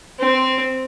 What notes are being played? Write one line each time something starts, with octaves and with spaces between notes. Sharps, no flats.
C4